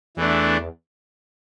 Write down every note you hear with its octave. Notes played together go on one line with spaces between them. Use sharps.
E2 E3 A3 D4